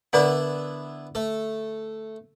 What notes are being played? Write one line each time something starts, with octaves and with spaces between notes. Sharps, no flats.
D3 B3 D4 E4 D5 F#5
A3